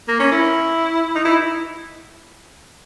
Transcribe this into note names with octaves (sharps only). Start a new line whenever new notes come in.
A#3
C#4
E4
D#4
E4